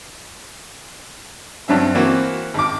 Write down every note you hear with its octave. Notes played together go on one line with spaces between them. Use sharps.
G2 F#3 C4 E5
E3 A#3 C4 E4 F#4
G#1 D6